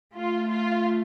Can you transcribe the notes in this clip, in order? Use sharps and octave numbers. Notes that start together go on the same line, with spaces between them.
A3 F4
F4